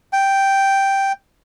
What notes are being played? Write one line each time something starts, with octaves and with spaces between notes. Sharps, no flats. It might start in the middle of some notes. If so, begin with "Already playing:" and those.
G5